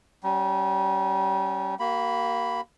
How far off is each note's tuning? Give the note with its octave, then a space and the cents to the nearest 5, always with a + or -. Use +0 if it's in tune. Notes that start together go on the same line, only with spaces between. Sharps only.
G3 -30 C#4 +0
A#3 +0 G4 -45 B5 +0